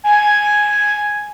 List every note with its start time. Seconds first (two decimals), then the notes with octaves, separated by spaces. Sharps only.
0.04 G#5